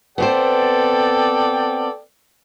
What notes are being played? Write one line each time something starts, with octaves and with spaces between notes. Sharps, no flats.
B3 C4 A4 C5 D5 G5